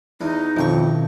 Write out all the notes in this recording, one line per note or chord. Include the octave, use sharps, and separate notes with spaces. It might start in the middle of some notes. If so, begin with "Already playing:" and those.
E2 D#4
A1 F2 B2 D#3 G5 C#6